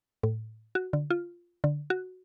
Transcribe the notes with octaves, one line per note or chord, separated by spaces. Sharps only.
A2
F#4
D3
F4
D3
F#4